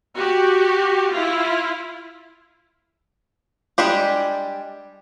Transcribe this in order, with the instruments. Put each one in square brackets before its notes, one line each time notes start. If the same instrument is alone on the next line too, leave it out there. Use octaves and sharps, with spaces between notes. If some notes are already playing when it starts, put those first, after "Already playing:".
[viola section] F#4 G4
E4 F4
[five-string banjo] G3 G#3 D4 G4